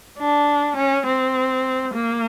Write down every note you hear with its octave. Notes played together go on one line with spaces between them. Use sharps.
D4
C#4
C4
A#3